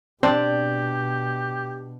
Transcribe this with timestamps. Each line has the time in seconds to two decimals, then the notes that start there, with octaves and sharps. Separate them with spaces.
0.23 B2 C4 D4 G4